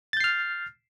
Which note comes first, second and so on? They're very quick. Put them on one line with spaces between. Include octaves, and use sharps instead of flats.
A6 G6 C7 F6